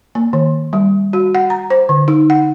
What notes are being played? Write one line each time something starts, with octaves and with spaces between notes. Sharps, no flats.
A#3
D#3
G3
F#4
F#5
A#5
C5
D3
D#4
F#5